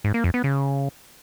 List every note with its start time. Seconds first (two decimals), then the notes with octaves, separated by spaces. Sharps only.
0.04 G#2
0.14 A#3
0.24 F2
0.34 B3
0.44 C#3